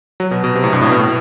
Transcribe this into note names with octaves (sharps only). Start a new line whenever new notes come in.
F#3
B2
B2
C3
A2
G2
A2
B2
A2